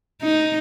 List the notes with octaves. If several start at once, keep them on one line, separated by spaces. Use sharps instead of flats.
D#4